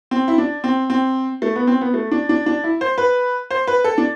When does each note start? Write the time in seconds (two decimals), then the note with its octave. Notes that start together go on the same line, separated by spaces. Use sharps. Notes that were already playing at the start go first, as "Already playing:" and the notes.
0.11 C4
0.28 E4
0.38 D4
0.64 C4
0.90 C4
1.42 A3
1.56 B3
1.67 C4
1.81 B3
1.94 A3
2.12 D4
2.29 D4
2.46 D4
2.64 E4
2.81 C5
2.98 B4
3.51 C5
3.67 B4
3.84 A4
3.98 D4